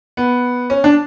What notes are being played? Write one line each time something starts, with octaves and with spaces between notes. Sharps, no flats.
B3
C#4
D4